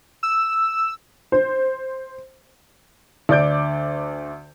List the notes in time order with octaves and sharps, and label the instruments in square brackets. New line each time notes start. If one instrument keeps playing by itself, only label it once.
[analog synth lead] E6
[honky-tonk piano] C5
[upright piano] D2 D5 D6 G6 D7